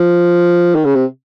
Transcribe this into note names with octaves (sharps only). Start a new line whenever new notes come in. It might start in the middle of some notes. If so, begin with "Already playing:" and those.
Already playing: F3
D#3
C#3
C3